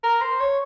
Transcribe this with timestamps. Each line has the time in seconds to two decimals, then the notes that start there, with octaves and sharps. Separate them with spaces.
0.03 A#4
0.21 C5
0.40 C#5